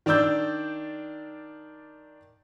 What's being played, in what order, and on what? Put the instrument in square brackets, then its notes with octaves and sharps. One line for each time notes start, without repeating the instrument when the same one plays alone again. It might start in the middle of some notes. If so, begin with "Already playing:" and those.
[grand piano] D#3 D4 D5 E6 G6